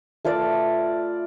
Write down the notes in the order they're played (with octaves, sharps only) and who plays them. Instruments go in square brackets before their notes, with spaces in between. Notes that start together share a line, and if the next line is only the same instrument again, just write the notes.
[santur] A3 F4 B4 D5